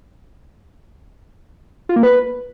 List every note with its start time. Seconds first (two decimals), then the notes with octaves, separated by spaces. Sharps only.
1.89 F4
1.96 A#3
2.03 B4